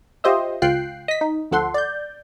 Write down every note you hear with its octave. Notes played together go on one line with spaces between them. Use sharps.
F4 G4 C5 D#5 E5
C#2 F4 G5 F#6 C7
D#5 B6
D#4
D2 F3 A4 F#5 C6
D5 G6